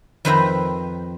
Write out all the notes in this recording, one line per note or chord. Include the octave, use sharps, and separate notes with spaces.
F2 D#3 B4 C5 E5 A#5